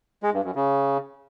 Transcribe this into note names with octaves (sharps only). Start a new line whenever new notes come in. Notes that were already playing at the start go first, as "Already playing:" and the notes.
G#3
G2
F#2
C#3